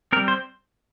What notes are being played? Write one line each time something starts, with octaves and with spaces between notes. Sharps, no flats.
G3 C4 A#4
C5